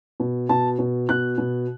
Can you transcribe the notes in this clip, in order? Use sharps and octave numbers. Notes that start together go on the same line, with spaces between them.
B2
B2 A5
B2
B2 F#6
B2